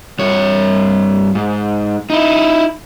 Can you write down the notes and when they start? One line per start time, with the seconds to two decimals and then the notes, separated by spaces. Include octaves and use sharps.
0.19 G2 C#5
1.35 G#2
2.10 D#4 E4